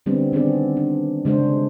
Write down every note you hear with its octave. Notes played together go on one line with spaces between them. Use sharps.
D3 G3 B3 C4 D4
D#3 B3 C4 D4 G#4 D5
D4
C#3 G#3 D4 F#4 C5